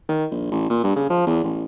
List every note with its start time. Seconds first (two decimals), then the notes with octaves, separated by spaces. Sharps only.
0.09 D#3
0.31 A#1
0.51 A1
0.70 A#2
0.84 G2
0.96 C#3
1.10 F3
1.27 E2
1.44 A1